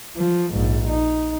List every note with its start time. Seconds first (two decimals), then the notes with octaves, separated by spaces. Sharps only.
0.17 F3
0.52 A#1 G#2
0.88 D#4